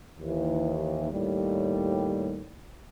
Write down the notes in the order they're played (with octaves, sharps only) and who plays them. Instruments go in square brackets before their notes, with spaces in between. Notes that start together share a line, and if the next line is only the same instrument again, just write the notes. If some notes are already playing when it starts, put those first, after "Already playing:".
[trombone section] D#2 E3
D#2 A2 G3